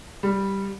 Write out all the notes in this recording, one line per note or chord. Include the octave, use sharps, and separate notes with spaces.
G3